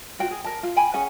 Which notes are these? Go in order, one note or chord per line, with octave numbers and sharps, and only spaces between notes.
F4 F#4 G5
G#4
A#4 A5
F4
G5 G#5 B5
C#4 G#4 F#5 G#5